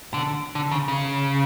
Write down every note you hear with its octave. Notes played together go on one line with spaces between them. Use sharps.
D3
D3
C#3
C#3